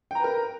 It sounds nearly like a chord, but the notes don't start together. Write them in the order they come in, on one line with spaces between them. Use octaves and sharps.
G5 A#5 B4 A#4